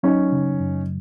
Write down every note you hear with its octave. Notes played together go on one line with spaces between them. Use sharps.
F#3 C#4 D#4
C#3
F#2